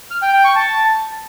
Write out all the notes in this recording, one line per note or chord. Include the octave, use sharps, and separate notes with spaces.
F6
G5
G5
C#6
A5